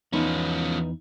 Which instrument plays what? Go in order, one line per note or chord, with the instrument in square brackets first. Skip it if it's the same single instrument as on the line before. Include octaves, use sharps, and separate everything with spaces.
[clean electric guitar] E2 B5 C6 [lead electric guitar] F3 C#4 [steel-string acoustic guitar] B3 D#4